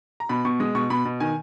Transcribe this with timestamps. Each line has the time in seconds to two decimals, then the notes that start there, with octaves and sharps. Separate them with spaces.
0.20 A#5
0.29 B2 B5
0.45 B2 C#6
0.60 G#3 D#6
0.75 B2 C#6
0.90 B2 B5
1.05 B2
1.20 D#3 G#5